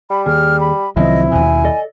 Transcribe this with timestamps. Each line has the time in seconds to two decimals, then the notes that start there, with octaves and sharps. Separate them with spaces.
0.10 G3 B5
0.26 D#2 G#4 F6
0.60 B5
0.97 C2 D#3 F3 F#3 C4 E4 D#5
1.31 D#2 B2 G#5
1.64 A4 D5 D#5